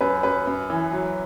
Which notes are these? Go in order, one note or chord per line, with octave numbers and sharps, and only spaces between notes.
F#2 B4
F#2 B4
F#2
E3
F#3